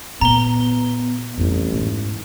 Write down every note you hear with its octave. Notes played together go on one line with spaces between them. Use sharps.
A#2 B3 A#5 G7
A1 F2 G3
G#2